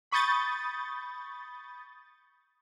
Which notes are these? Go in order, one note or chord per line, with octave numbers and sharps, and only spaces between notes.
B5 C#6 D#6 G6 A6